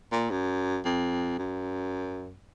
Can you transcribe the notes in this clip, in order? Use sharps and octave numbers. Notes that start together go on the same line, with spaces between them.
A#2
F#2
F2
F#2